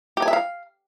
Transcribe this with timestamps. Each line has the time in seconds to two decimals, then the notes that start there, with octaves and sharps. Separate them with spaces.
0.17 G4
0.22 G#5
0.28 E5
0.33 F5